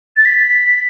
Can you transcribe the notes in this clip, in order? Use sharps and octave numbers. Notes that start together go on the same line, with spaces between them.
A6
B6